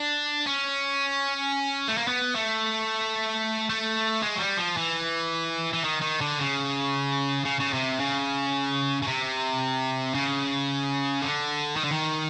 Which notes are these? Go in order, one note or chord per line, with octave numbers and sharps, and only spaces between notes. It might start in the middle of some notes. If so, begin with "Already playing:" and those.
Already playing: D4
C#4
A3
A#3
B3
A3
A3
G#3
F#3
G3
F3
E3
E3
D#3
D#3
D3
C#3
C#3
C#3
C3
C#3
C#3
C3
C#3
D3
D#3
D3
D#3